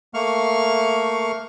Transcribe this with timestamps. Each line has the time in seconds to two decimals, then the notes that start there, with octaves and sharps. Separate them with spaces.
0.14 A3 A#3 F5 C#6 F6